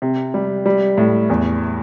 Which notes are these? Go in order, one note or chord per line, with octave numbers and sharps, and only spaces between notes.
C3
G3
G3
A2
E2